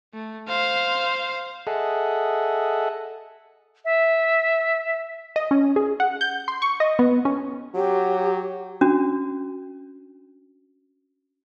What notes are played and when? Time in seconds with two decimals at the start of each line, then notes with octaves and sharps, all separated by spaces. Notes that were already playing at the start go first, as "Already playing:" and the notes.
0.14 A3
0.48 C5 F5
1.67 G#4 A4 D#5 E5 F#5
3.85 E5
5.36 D#5
5.51 C#4
5.76 G#4
6.00 F#5
6.21 G6
6.48 C6
6.62 C#6
6.80 D#5
6.99 B3
7.25 C#4
7.75 F#3 G4
8.81 C#4 D4 F#4